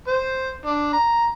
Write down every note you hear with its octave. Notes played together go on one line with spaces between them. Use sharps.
C5
D4
A#5